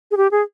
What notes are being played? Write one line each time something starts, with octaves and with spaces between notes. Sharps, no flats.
G#4
G4
G#4